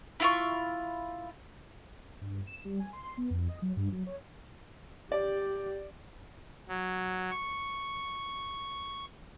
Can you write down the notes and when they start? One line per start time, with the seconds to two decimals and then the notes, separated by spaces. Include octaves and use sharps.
0.20 E4 F4 C#6
2.21 G2
2.47 E7
2.65 G3
2.80 G#5
2.93 C6
3.17 B3
3.30 F2
3.49 D#5
3.62 F#3
3.77 G2
3.92 F#3
4.07 C#5
5.12 G4 D5
6.68 F#3
7.31 C#6